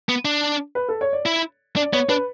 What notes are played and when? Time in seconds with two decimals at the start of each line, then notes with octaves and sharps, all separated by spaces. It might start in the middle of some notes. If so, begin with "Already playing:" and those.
0.09 B3
0.25 D4
0.75 B4
0.89 A4
1.01 C#5
1.13 D5
1.26 E4
1.76 D4 D5
1.93 B3 C#5
2.09 D4 B4